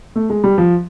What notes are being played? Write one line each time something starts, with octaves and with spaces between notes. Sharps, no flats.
A3
G#3
G3
F3